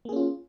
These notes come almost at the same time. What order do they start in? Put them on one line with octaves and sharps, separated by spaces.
A#3 G#4 C#4 F4